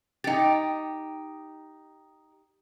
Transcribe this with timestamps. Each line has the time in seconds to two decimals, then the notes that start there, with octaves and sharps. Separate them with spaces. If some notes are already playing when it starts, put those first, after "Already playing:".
0.24 D#4 G4 G5 A6